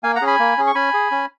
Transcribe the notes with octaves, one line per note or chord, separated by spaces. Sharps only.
A#3 F5 G#5
F#5 A#5
C#4 G#4
G#5 B5
A#3
C#4 G#4
C#6
C#4 G#5 B5
G#4
C#4